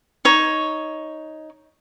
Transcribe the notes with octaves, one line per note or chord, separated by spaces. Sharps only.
D#4 C#5